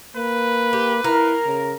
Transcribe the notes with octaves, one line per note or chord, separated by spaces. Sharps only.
A#3 B4
G4
A#3 E4 A#4
C#3